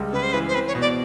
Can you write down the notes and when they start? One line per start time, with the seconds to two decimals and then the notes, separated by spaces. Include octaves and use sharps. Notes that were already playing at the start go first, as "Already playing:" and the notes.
Already playing: C#2 G3
0.13 C#3 B4
0.23 C5
0.33 E3 B4
0.48 C5
0.55 C4 B4
0.68 C#5
0.75 B2
0.81 D5